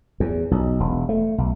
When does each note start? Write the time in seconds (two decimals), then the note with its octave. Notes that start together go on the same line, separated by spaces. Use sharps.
0.20 E2
0.51 B1
0.80 E1
1.09 A3
1.38 B1